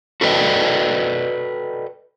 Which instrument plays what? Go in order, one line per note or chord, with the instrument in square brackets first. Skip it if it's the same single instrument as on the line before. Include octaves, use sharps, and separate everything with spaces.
[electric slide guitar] F#4 A4 B4 D5 D#5 G5